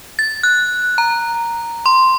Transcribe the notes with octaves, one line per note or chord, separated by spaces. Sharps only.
A6
F#6
A#5
C6